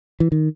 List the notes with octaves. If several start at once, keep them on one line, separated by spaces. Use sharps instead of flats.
E3
D#3